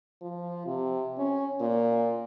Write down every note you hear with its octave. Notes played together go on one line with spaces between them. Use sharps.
F3
C3
C#4
A#2